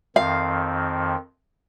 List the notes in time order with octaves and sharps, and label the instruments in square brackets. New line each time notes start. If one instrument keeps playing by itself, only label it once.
[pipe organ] F2 D#3 C4 [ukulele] F5